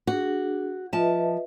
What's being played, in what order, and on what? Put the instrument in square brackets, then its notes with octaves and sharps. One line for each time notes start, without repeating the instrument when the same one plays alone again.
[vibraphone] D4 G#4 [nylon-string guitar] F#4
[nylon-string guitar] F3 A5 [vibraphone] B4 D#5 E5